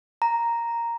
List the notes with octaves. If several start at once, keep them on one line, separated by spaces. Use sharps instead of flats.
A#5